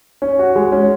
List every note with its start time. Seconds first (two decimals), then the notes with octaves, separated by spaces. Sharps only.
0.22 C#4
0.39 F#4
0.56 G#3
0.72 C#4